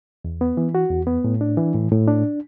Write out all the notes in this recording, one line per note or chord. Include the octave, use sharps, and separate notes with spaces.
E2
B3
E3
F#4
E2
B3
A2
D4
E3
A2
A2
D4